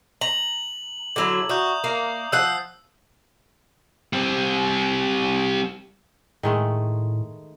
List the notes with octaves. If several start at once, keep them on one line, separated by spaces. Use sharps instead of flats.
A#5 F#7
D3 F#3 E4 D6 E6 G#6
F#4 D5 E5 A#5 D#6 G6
A#3
F3 F#5 E6 C7
G3 C4
A2 D#3 G#3 A3